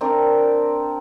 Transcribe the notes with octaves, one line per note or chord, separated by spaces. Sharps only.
C4 D4 A#4 D5